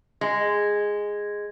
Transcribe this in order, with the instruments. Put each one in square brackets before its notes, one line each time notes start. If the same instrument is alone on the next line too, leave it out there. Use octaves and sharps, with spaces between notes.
[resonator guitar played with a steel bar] G#3